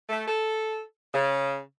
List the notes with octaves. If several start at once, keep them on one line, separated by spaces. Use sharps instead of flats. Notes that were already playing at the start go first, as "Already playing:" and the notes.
A3
A4
C#3